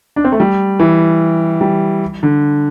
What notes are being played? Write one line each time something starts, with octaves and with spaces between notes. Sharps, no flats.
D4
C4
A3
G3
E3
G3
D3